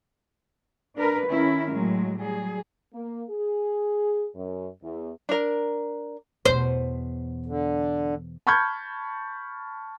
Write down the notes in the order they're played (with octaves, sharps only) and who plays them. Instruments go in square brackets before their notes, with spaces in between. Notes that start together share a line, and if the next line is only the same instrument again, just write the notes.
[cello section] D4 A#4 B4
D#3 C#4 E4 A#4
A2 F#3 G#3
F#3 G3 G#4
[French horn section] A#3
G#4
F#2
E2
[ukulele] D4 A#4
[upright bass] E2 B2 [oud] C5
[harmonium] D3
[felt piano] A5 B5 C#6 F6 G6 G#6